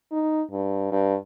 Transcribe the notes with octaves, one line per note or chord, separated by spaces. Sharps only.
D#4
G2
G2